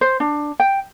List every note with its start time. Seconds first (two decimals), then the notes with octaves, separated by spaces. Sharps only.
0.01 C5
0.20 D4
0.60 G5